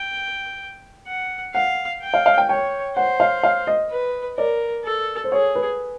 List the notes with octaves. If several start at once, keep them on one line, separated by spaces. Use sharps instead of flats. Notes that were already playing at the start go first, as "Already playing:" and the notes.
Already playing: G5
F#5
F5 F#5
G5
F5
F5
G5
C#5 G5
C5 F#5
F5
F5
D#5
B4
A#4 D5
A4
C5
G#4 C#5
B4